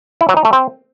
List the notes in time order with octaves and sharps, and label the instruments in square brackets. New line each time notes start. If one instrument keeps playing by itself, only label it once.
[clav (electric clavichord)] E4
F#3
D#4
A3
C4